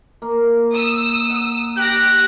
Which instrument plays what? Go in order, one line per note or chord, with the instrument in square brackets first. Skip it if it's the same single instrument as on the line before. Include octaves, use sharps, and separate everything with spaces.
[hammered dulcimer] A#3
[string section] D#6 E6
[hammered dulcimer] F#5
[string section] G4 A#6 [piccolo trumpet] F#6